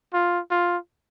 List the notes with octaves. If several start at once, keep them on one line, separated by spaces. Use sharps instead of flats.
F4
F4